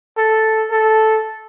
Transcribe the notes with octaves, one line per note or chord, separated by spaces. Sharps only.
A4
A4